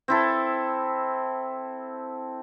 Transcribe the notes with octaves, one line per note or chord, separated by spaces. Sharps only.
C4 E4 A4